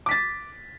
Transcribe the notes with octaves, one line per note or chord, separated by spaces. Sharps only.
D6 A6 B6